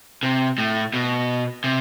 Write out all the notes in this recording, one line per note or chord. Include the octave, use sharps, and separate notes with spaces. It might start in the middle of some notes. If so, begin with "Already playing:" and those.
C3
A2
B2
C3